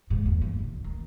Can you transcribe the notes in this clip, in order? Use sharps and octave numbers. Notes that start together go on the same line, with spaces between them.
G#2
E2
G2
C2
D#3